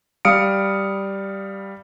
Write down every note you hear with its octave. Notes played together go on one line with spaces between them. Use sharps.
G3 F5 D#6 F6 C#7 D7